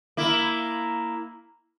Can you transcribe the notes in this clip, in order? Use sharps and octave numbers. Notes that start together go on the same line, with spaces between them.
A#3 E4